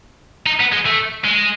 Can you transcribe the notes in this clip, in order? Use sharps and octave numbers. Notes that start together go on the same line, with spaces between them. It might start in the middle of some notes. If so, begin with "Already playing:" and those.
D#4
B3
G#3
A3
G#3